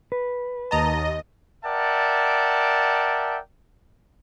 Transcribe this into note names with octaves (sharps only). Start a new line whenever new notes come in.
B4
D#2 D#5 A5 A#5
A#4 D5 E5 F#5 G5 A5